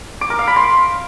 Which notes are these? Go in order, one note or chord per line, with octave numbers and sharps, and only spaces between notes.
D6
A#4
F5
B5
C6